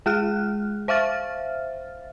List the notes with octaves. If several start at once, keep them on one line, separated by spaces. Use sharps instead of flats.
G#3 G#4 F6 F#6
C5 E5 F5 F6 A6